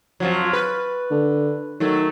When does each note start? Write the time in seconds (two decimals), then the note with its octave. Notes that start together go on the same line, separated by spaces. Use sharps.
0.20 F2 F3 F#3
0.53 B4
1.11 D3
1.80 D#3 F#3 A3